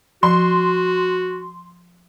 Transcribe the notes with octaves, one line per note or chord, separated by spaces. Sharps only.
F3 F#4 C6